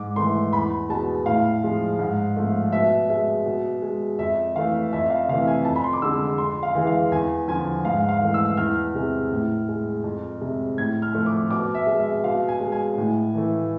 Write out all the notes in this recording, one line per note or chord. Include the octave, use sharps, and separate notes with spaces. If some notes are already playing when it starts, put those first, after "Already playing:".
Already playing: G#2 D6
E3 A3 C6
E2 B5
B2 G#3 A5
A2 F5
F3 G#3
G#2
F3 A3
B2 E5
G#3 E5
B2
G#3
F2 E5
E3 A3 F5
F2 E5
F5
C3 E3 A3 F5
G#5
F2 A5
B5
C6
D6
D3 G#3 E6
F2 C6
F5
E3 G#3
F5
E2 G#5
D3 F3 G#5
G#2 F5
F5
E3 A3
E6
E2 F6
C3 G#3
A2
G#3
F2
C3 G#3
A2 G#6
F6
F3 A3
D6
B2 D6
E5
G#3
E5
B2 F5
G#5
G#3
G#5
A2
E3 A3